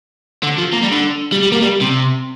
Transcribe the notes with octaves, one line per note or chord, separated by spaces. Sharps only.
D3
F3
A#3
G3
D3
G3
G3
A#3
G3
C3